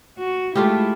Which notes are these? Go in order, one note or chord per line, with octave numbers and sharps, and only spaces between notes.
F#4
G#3 A3 E4 F4 G4